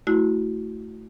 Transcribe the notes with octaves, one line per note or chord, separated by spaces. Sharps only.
A3 E4 F#4